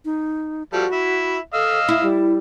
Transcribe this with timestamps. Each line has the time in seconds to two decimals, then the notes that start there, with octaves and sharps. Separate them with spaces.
0.05 D#4
0.73 F3 G3 F#4 A4
0.92 E4 E5
1.54 A4 D#5 F5 E6
1.89 E4 E5
2.03 G3